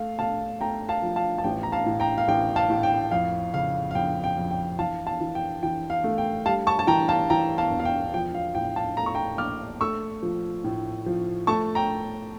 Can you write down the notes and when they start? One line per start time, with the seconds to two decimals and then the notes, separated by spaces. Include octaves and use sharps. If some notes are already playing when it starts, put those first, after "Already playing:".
Already playing: A3 F5
0.19 A3 F5 A5
0.61 A3 G5 A#5
0.89 F5 A5
1.03 F3
1.16 F5 A5
1.38 A5
1.44 A1 G5
1.63 A#5
1.72 F5 A5
1.86 A2
2.00 G5 A#5
2.18 F5
2.28 A1 G5
2.56 F5 A5
2.70 A2
2.83 G5
3.11 F2 F5
3.54 C#3 F5
3.91 F5
3.95 F2 G5
4.24 G5
4.38 F2
4.51 G5
4.79 E3 F5 A5
5.06 F5 A5
5.21 E3
5.35 G5
5.63 E3 G5
5.90 F5
6.04 A3
6.18 G5
6.46 G3 F5 A5
6.67 A5 C#6
6.79 A5
6.87 E3 G5 A#5
7.08 F5 A5
7.30 E3 G5 A#5
7.58 F5 A5
7.71 E1
7.79 F5
7.85 G5
8.14 F3 G5
8.35 F5
8.55 A2 G5
8.76 F5 A5
8.97 A3 A#5
9.06 C#6
9.15 G5 A#5
9.38 A#1 D6 F6
9.81 A3 C#6 E6
10.23 F3
10.64 A2
11.06 F3
11.47 A3 A5 C#6
11.75 G5 A#5